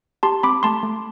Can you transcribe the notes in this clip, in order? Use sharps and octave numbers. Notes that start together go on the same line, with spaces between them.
G4 A5 C6
C4 B5 D6
A3 A5 C6
A3